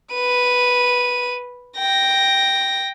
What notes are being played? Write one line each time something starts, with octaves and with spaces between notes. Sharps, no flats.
B4 D#7
G5 A#6